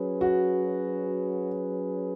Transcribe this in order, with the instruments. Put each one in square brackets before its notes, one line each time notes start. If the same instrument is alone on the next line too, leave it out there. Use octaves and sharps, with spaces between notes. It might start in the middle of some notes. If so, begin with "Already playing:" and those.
Already playing: [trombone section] F#3 C#4 G#4 B4
[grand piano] F#4